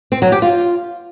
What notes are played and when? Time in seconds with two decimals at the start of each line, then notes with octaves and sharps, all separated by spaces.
0.12 C4
0.22 F#3
0.32 G4
0.42 F4